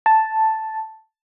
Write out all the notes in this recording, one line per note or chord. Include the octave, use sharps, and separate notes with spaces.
A5